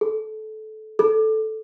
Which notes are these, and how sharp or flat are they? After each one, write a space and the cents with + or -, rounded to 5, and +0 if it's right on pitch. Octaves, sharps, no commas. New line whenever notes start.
A4 -20
A4 -5